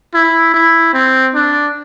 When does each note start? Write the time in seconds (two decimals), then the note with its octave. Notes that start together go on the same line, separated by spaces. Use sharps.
0.14 E4
0.54 E4
0.93 C4
1.34 D4